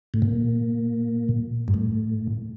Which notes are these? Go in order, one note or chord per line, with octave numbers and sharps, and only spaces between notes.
A2
A#2
G2
A2